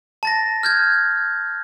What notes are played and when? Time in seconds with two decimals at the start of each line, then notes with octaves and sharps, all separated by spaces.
0.23 A5 A6 A#6
0.63 F6 G6 G#6